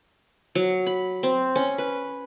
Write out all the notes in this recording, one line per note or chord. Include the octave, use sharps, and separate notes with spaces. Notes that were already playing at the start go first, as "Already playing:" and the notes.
F#3
B5
C4
C#4
B4